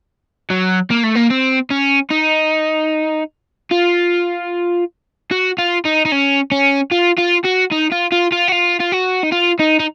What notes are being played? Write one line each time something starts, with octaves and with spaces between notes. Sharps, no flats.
F#3
A#3
A3
A#3
C4
C#4
D#4
F4
F#4
F4
D#4
D#4
C#4
C#4
F4
F4
F#4
D#4
F4
F4
F4
F#4
F4
F4
F#4
D#4
F4
D#4
D#4